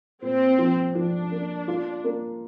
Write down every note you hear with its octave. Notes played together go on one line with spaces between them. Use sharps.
A#2 C4
F3
F3 D4
A#3
F4
A#3